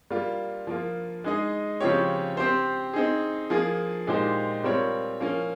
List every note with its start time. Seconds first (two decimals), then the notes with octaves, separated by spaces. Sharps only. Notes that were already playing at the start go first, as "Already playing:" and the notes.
0.11 G3 A#3 F4
0.67 F3 A#3 F4
1.24 G#3 D#4 G#4 D#5
1.80 C#3 F3 C4 G4 C#5
2.37 C4 G4 C5
2.93 C4 D#4 G#4
3.50 F3 A#3 F4 G#4
4.07 A#2 G#3 D#4 G4 C5
4.64 G3 C4 F4 A#4 C#5
5.20 F3 A#3 C#4